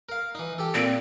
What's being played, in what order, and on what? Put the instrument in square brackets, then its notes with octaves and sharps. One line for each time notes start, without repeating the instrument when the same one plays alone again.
[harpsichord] A#4 F5
E3 D#4
G4 A4
[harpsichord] A#2 [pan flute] C4